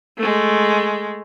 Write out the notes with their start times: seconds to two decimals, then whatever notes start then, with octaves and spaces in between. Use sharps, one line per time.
0.18 G#3 A3